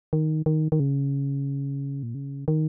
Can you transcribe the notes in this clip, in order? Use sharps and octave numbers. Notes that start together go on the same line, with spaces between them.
D#3
D#3
D#3
C#3
A#2
C#3
D#3